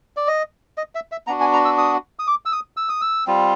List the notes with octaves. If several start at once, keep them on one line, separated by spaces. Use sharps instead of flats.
D5
D#5
D#5
E5
E5
B3 D4 F#4 A#5
G#5
A#5
E6
D#6
D#6
D6
E6
D#6
E6
D#6
E6
G3 C4 F4